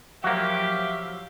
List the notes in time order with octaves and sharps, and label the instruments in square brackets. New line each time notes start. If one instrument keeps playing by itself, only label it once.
[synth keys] F3 F#3 [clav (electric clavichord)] A#3 F#4 [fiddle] G4 [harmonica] E5 F5